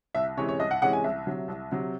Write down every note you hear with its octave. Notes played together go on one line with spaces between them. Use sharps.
C2 E5
C3 E3 G#3 C#4 C#5
C#5
C2 D#5
F#5
C3 E3 G#3 C#4 F#5
G#5
C2 E5
C3 F#3
C2
C3 F#3